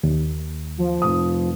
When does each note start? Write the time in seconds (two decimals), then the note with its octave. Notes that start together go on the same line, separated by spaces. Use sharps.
0.04 D#2
0.78 F3
1.02 F1 D#6